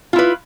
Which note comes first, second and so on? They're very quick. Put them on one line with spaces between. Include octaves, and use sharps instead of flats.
F4 E4 B4